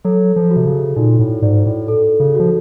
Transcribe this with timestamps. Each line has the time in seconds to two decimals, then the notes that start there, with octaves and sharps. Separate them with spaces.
0.05 F#3 A4
0.36 F3
0.51 F#4
0.56 C3
0.67 C#3
0.96 A#2 D#4
1.19 A2
1.42 G#2 D5
1.66 A2
1.88 A4
2.20 C#3
2.35 F3 F#4